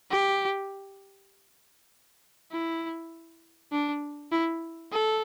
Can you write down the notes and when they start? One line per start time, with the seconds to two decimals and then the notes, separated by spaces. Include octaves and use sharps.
0.11 G4
2.51 E4
3.72 D4
4.32 E4
4.92 A4